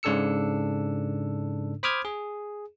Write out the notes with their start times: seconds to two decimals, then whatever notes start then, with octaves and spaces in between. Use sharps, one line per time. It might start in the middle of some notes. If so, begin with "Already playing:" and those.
0.03 G#2 C#3 D4 A4 E6 C#7
1.83 C5 B5 D6 D#6 F6 G#6
2.05 G#4